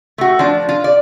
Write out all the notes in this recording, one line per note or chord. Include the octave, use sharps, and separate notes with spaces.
A3 F#4
F3 D4
F4
D5